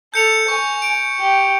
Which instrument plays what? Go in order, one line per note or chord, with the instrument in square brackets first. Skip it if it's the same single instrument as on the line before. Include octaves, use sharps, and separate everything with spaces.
[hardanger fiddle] A4 [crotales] G6 C#7 F7
[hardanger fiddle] G#5 [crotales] C#6
[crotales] D7
[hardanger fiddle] G4